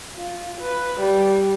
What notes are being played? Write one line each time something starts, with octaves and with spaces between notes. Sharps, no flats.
F4
B4
G3